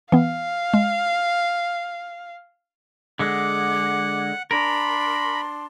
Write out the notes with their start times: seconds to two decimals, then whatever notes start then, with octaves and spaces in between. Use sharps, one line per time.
0.12 E3 B3 F5
0.74 G#3
3.19 D3 G#3 F#5 D6
4.51 D4 A#4 A5 B5 C6